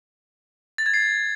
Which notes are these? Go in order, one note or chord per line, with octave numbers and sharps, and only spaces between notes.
A6
G#6
C7